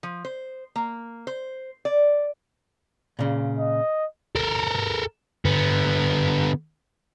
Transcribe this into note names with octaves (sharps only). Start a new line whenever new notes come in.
F3
C5
A#3
C5
D5
A#2 C#3
D#5
A4 A#4
D3 B3